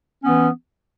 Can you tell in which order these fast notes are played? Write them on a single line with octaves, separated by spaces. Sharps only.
C#4 B3 E3